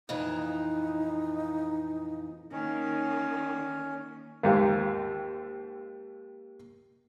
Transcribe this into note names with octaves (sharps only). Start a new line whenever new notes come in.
F2 A#2 E3 D#4
D#3 A#3 C#4
D#2 G#2 A#3 F4 G4